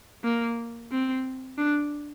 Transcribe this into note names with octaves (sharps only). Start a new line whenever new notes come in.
A#3
C4
D4